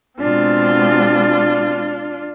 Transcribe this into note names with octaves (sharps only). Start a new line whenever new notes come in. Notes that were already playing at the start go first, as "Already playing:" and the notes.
B2 G#3 C4 D4 F4